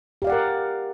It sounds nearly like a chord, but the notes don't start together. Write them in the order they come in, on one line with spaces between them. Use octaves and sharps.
G4 F5 D5 F#5 A#4